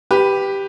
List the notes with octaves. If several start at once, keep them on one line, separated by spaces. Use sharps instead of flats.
G4 B4